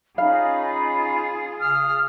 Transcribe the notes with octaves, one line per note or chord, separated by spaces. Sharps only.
C#4 D#4 F4 G#4 F5 B5
C#3 D#6 F6